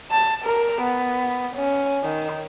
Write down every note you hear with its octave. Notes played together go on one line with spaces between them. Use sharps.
A5
A#4
B3
C#4
D#3